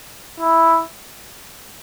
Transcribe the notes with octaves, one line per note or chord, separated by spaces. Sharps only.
E4